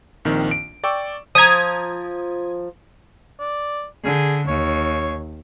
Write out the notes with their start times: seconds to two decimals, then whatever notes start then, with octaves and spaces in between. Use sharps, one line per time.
0.25 A#1 D#3 C4
0.51 D7
0.84 D5 G5 C#6 D6 E6
1.35 F3 A#5 D#6 G#6
3.40 D5
4.04 D3 G#4
4.48 D#2 C#5